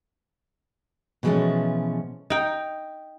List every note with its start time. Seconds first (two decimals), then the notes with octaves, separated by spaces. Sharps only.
1.23 B2 E3 F3 G#3 A3 C#4
2.30 D#4 G5